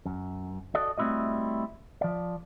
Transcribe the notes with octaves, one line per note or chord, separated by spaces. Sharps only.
F#2
F#4 A4 D5 D#5
G3 A3 C4 E4 F#4 D#5
F3 D5